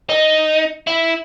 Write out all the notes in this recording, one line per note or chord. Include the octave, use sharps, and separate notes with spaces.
D#4
E4